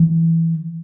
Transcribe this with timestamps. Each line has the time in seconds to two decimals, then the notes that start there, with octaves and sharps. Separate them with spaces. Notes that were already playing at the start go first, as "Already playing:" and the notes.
Already playing: E3